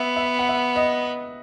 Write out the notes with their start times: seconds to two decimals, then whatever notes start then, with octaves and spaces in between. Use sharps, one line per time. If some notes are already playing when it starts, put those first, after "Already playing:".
Already playing: B3 E5
0.16 E5
0.39 F#5
0.49 E5
0.76 D#5